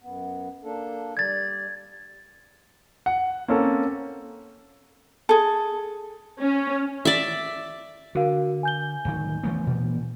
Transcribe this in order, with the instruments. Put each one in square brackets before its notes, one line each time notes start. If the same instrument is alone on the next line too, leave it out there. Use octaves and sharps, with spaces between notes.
[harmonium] F#2 B3
A#3 D4 A4
[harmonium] G3 D5 [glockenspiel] G#6 A6
[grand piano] F#5
A#3 C4 C#4 A4
[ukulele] G#4 A4
[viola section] C#4
[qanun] D5 E5
[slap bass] D3 [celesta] F#4 A#4 F5
[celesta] G#5 G6 G7
[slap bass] D1 D#3
E3 A3 B3
A#2 E3